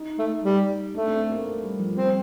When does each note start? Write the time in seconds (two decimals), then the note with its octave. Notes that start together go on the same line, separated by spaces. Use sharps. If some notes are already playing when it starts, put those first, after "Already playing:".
Already playing: D#4
0.18 A3
0.44 G3
0.94 A3 D4
1.08 C4
1.19 C4
1.32 A#3
1.45 A3
1.62 G3
1.79 F3
1.95 G3 C4